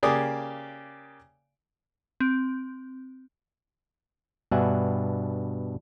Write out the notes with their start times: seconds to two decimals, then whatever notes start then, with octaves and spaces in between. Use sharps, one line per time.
0.03 C#3 A#3 G4 D5 G#5 D#6
2.20 C4
4.51 G2 B2 D4 E5 F#5 G#5